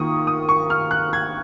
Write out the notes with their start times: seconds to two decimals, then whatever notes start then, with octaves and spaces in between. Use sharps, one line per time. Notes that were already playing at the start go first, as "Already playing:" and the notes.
Already playing: D#3 A#3 F4 C#6 D#6
0.27 D#6
0.49 C#6
0.70 F6
0.91 F#6
1.13 G#6